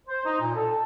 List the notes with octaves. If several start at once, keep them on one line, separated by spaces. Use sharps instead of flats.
C5
D#4
A#2
A4